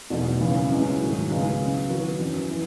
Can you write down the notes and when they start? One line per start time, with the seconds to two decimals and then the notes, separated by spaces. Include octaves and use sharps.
0.10 E2 B2 F#3 A3 D#4
0.40 F#2 C#3 E3 B3
0.70 C#2 C#3 G#3 B3 E4
1.00 G#2 D#3 F#3 A3
1.30 C#2 C#3 G#3 B3
1.60 C#3 F#3 B3
1.89 D#3 F#3 B3 F#4 B4
2.19 F#2 E3 B3
2.49 E3 B3 E4